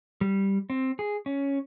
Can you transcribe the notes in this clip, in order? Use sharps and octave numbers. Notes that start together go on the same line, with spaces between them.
G3
C4
G#4
C#4